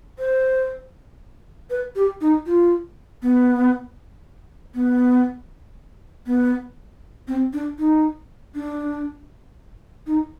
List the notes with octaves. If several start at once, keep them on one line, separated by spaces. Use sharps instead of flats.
C5
B4
G4
D#4
F4
B3
B3
B3
C4
D4
D#4
D4
D#4